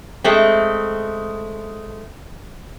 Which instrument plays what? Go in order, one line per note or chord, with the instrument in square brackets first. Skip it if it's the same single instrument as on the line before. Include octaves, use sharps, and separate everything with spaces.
[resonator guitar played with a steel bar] G#3 A3 C4